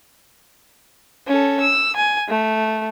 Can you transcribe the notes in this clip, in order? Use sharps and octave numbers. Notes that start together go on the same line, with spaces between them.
C#4 A4
E6
G#5
A3